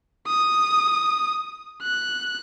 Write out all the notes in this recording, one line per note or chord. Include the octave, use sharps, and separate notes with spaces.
D#6
F#6